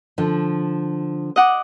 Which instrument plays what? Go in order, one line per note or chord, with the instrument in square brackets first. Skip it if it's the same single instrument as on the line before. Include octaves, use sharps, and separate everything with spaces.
[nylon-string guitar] D3 F3
[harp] D#5 F#5 D6